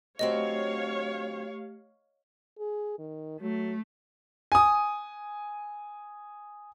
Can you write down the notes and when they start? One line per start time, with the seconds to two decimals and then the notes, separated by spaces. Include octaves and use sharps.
0.19 D3 F#3 A3 C4 G4 C#5 D#5 F5
2.59 G#4
2.99 D#3
3.41 F#3 A3
4.52 G#5 D#6